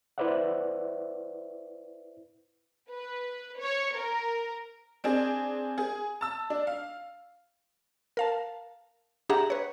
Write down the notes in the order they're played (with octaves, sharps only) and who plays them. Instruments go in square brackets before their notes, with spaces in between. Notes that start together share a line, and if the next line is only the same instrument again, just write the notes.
[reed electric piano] E4 B4 C5 D5 E5 F#5
[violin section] B4
C#5
A#4
[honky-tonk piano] C4 D4 G#4
G#4
A5 E6
D4
F5
[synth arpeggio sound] A#4 F5 A5
D4 G4 G#4 E5 F#5 A#5
B4 C#5